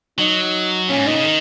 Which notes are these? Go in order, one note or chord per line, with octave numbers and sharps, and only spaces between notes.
F#3 D#4
A#2 C#4
G#2
A#2 D#4
C#3
D#3